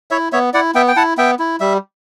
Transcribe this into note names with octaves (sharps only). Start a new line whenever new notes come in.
E4 C#5 E5
B3 C#5 E5
E4 D5 F#5
B3 E5 G5
G5
E4 F#5 A5
B3 E5 G5
E4
G3 E5